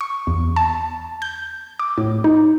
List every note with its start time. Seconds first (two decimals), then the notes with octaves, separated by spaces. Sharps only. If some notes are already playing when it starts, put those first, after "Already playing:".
0.01 C#6
0.27 E2
0.56 A5
1.22 G6
1.79 D6
1.98 A2
2.24 D#4